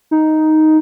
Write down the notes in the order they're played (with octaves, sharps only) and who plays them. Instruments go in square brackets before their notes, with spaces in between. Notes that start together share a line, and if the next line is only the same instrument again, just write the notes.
[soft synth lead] D#4